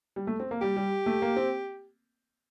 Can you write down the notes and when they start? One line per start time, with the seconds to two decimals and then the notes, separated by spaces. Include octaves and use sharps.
0.16 G3
0.27 A3
0.40 C4
0.51 A#3
0.62 G3 G4
0.77 G3
1.06 A3
1.22 A#3
1.37 C4